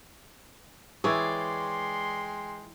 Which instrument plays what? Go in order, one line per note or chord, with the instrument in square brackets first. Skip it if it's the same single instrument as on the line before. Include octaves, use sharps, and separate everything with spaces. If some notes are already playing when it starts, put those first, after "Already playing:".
[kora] E3 E4 G#4 [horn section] G#3 G5 C6 [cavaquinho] C#5 D5